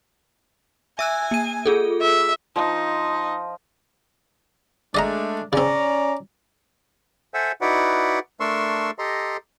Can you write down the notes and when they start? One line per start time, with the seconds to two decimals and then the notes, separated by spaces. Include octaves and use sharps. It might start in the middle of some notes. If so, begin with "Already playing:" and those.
0.99 E5 G#5 E6 F#6
1.31 A#3 D#7
1.66 F4 G#4 A4
2.01 E5
2.56 F3 D#4
4.95 G#3 A3 D4 D5 D#5 A#5
5.53 C#3 C4 C#4 D5 A#5
7.34 A4 C5 E5 F#5 G#5 E6
7.61 D#4 E4 F#4 B4 D5 F#5
8.40 A3 D4 A#4 C6 C#6 E6
8.99 G4 A4 D#5 A#5 C6